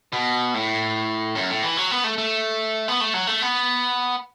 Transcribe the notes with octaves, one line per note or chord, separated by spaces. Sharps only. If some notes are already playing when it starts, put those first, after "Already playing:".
B2
A2
F#2
A2
E3
F#3
B3
A3
A3
B3
A3
F#3
A3
B3